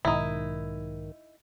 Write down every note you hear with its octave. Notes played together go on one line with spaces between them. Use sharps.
B1 G#2 D#3 D#4 E4